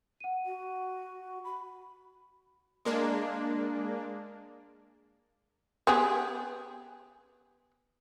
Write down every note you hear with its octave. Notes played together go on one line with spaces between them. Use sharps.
F#5 D#7
F#4
B5
G#3 A#3 D4
B3 G4 G#4